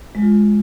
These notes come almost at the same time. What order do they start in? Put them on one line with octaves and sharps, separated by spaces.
G#3 F#3 F4